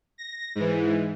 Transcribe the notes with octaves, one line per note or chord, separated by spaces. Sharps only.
A#6
G#2 E3